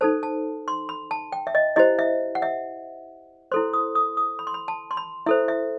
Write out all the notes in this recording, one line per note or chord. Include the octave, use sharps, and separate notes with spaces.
D#4 A4 C5 A5
A5
C6
B5
A5
G5
E5
D#5
E4 G4 C5 D#5
E5
F#5
E5
E4 A4 C5 C6
D#6
D#6
D#6
B5
C6
B5
A5
C6
B5
E4 A4 C5 E5
E5